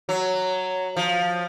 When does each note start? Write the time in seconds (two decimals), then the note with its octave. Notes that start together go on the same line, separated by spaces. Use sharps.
0.09 F#3
0.97 F3